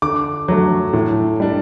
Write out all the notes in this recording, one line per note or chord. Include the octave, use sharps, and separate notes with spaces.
D3 D6
F#3 A3
A2
G3 D4